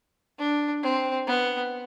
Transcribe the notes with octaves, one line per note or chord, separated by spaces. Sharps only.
D4
C4
B3